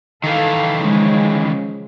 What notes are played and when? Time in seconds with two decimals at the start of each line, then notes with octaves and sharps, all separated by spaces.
0.24 D#3 E3 A4 F5
0.77 C#3 F3 G#3